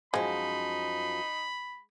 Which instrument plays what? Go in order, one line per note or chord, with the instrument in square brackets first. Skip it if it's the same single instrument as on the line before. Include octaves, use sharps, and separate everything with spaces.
[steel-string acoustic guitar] F#2 F3 [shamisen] G#3 [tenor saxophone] D#4 [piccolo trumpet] B5